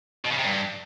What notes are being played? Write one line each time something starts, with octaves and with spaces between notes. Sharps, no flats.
B2
C#3
C3
G2